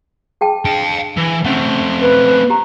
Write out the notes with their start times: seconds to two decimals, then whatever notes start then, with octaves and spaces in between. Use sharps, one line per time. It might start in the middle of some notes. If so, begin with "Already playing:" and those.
0.41 G#4 G5 A5
0.65 D4 F5 G5
1.17 E3
1.45 A3 C4 C#4
2.01 B4
2.50 G4 A#5